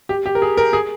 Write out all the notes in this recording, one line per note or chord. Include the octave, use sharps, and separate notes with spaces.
G4
G4
A#4
G#4
A#4
G#4